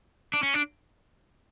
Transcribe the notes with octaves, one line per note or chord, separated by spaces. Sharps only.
D4
C#4
D4